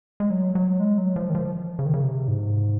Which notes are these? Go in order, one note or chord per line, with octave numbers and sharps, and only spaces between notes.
G#3
F#3
F#3
G#3
F#3
F3
D#3
F3
C#3
D#3
C#3
C3
G#2